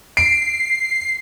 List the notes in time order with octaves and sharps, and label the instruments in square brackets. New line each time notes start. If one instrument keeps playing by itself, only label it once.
[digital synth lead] C7 [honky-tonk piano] D7